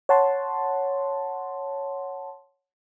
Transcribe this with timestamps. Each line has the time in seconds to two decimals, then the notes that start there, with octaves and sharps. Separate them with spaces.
0.09 C#5 F#5 A5 C6